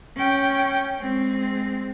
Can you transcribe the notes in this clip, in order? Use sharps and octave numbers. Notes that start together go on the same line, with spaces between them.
C#4 G5
G#3 C4